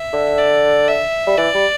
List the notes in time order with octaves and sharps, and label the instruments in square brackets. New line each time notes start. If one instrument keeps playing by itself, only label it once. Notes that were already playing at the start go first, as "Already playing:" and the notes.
Already playing: [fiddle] E5
[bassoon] D3
[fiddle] D5
E5
[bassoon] G3
[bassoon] E3 [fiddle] D5
[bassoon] G3